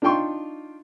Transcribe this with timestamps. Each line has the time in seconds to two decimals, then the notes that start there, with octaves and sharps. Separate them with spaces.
0.02 D4 D#4 F4 G5 C6 C#6